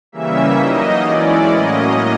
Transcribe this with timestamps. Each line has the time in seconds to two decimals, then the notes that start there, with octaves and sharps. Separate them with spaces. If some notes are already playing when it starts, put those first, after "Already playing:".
0.12 C#3 E3 G3 A#3 C#4 E5
0.58 F#3 A#3 D#4 D#5
1.03 E3 G#3 C#4 E4 D5
1.50 A2 F#3 A#3 C#4 D#5